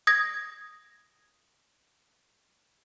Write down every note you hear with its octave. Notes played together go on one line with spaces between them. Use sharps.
D#6 G#6 A#6